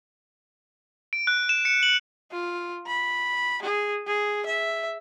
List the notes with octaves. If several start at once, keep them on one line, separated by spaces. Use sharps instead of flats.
D7
F#6
E7
C#7
F#7
F4
B5
G#4
G#4
E5